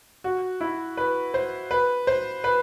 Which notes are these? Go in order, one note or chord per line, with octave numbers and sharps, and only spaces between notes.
F#4
E4
B4
C5
B4
C5
B4